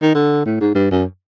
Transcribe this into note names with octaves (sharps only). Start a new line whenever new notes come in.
D#3
D3
A2
G#2
G2
F#2